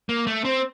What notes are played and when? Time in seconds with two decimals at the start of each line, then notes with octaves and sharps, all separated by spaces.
0.09 A#3
0.27 A3
0.45 C4